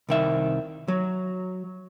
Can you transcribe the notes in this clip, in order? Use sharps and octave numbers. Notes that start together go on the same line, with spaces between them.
C2 D#3 E5
F#3